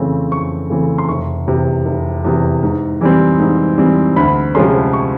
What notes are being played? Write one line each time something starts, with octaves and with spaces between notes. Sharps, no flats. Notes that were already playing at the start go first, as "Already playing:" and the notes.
Already playing: F2 C#3 E3 A3 C4
F2 C#6
C#3 E3 A3 C4
C6
F1 C#6
E2 C3
F1
E2 C3
G#2
E3 G3 C4
G#2
E3 G3 C4
D2 B5
C3 F3 G#3 C#4 C6
C#6